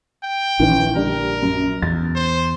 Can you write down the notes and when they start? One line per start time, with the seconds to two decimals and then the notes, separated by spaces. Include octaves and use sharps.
0.23 G5
0.60 A#1 D#3 E3 C#4
0.95 D3 G3 D4 A#4
1.42 F#2
1.82 E2 A6
2.15 C5